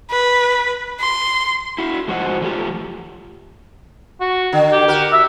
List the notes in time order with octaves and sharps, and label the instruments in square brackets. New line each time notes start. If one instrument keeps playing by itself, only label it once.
[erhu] B4
C6
[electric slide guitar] E4 F#4
G#2 F3 F#4 C5 D#5 F#5
E3 F3 A3 F4 G4
[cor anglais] F#4
[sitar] D3
[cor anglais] G4
[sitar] F#4 A#4
[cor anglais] E5